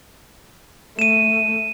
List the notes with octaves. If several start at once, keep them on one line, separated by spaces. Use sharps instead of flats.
A3 D#7 E7